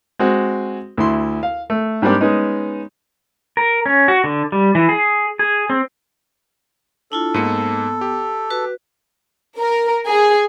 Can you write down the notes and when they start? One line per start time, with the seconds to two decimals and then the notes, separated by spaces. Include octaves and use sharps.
0.19 G#3 C4 F#4
0.97 D2 E4 C6
1.43 F5
1.70 A3
2.02 G#2 G3 A#3 C4 D4 G4
2.21 G#3 B3 C#4 D#4
3.57 A#4
3.86 C#4
4.08 F#4
4.24 D3
4.52 G3
4.75 E3
4.89 G#4
5.39 G#4
5.70 C4
7.12 D4 E4 F4 A4
7.34 G#2 A#3 B3 C#7
8.01 G4
8.50 F#4 B4
9.58 A#4
10.07 G#4